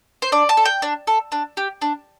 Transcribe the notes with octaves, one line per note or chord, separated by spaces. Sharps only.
C5
D4 D5
A5
A4
G5
D4
A4
D4
G4
D4